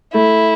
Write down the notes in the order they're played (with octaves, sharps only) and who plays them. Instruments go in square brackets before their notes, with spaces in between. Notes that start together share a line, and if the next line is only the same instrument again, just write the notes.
[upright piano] A3 [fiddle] E4